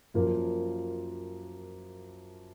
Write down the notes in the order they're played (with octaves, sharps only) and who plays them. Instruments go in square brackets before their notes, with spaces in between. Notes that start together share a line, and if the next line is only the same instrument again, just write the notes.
[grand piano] F#2 F3 A#3